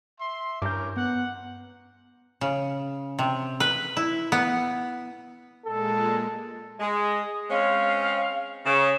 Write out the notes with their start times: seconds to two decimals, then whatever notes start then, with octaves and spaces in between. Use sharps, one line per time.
0.19 E5 C6
0.62 G2 C#4 E4 A#4 D6 G6
0.97 B3 F#5
2.41 C#3
3.19 C3
3.60 B4
3.97 E4
4.32 B3
5.65 A#2 G#3 A4
6.79 G#3 D#6
7.50 G#3 C4 C#4 F5
8.66 C#3 E7